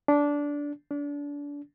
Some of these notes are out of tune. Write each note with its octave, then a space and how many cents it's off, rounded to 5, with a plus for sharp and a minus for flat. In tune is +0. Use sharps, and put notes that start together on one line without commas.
D4 -15
D4 -30